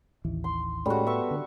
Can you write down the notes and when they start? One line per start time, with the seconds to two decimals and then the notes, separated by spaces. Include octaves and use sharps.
0.24 A1 D#2 E3
0.44 C6
0.86 A2 G3 G#3 C#4 F#4 A4
1.07 B3 A4 E5 C#6
1.31 D3